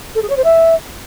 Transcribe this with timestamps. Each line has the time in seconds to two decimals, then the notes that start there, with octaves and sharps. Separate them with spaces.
0.15 A4
0.22 G#4
0.29 C#5
0.36 C5
0.44 E5